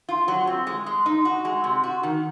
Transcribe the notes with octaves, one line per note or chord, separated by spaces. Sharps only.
F4
F#3
C4
G#3
G#3
D#4
F#4
G#3
C3
F#4
D#3